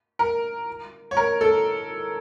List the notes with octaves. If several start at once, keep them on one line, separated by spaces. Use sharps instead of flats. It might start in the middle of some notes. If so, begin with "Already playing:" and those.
A#4
C#5
A#4
A4